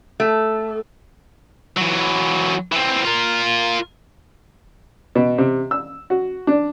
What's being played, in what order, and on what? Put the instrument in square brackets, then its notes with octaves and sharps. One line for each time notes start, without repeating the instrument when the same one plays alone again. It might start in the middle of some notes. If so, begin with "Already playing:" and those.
[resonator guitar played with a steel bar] A3
[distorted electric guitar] E3 F#3
E3 C4
F4 A#4
[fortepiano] B2
C3
E6
F#4
D4